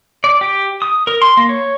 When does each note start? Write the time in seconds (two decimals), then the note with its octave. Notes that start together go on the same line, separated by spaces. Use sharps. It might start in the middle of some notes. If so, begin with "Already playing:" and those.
0.24 D5
0.41 G4
0.82 D#6
1.07 A#4
1.22 C6
1.37 A#3
1.49 C#5